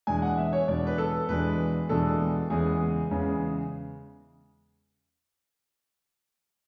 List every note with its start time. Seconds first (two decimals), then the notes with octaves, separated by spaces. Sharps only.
0.07 E2 B2 G#3 D4 G#5
0.22 F#5
0.38 E5
0.53 C#5
0.68 E2 B2 G#3 D4 D5
0.87 B4
0.98 A4
1.29 E2 B2 G#3 D4 B4
1.89 E2 B2 G#3 D4 A4
2.50 E2 C#3 G#3 B3 G#4
3.11 E2 C#3 G#3 B3